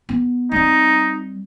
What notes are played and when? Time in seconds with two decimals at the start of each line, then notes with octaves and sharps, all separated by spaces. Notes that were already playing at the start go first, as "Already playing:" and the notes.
0.09 B3
0.52 G3 C4 D#4